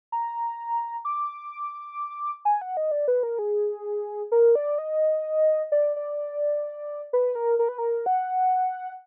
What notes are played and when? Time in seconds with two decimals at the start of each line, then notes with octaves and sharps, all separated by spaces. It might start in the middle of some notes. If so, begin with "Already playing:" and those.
0.12 A#5
1.05 D6
2.45 G#5
2.62 F#5
2.77 D#5
2.91 D5
3.08 B4
3.23 A#4
3.39 G#4
4.32 A#4
4.55 D5
4.78 D#5
5.72 D5
5.96 D5
7.13 B4
7.35 A#4
7.59 A#4
7.68 B4
7.78 A#4
8.06 F#5